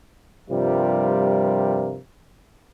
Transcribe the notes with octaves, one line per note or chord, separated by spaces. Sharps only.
G2 C3 F3 G3 F4 A#4